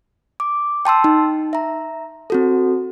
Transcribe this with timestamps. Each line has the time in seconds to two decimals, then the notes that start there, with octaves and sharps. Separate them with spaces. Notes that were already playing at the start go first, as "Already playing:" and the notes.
0.40 D6
0.85 G5 A5 C6 E6
1.04 D#4
1.53 E5 A#5
2.30 C4 F#4 A4